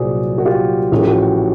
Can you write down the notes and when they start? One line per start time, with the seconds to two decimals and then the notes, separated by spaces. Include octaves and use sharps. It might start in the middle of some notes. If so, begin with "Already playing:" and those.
Already playing: C2 A#2 F#3 F#4 G#4 C5 D5
0.38 F#4
0.45 F4 G4
0.92 A1 A2 F3 G#4
0.99 G4
1.07 F#4 G#4